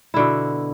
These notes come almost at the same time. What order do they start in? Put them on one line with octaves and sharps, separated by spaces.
E4 D3 B2